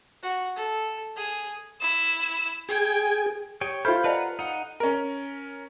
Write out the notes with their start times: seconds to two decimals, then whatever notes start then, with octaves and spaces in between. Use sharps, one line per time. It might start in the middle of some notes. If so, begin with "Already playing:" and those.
0.23 F#4
0.56 A4
1.17 G#4
1.80 E4 E7
2.69 G#4 G5 G#5
3.61 G4 C#5 G5
3.85 F4 A4 C5 E5 B5 G6
4.04 B4 D5 D#5 F#5 A5 A#5
4.39 D#4 F#5
4.80 C#4 A#4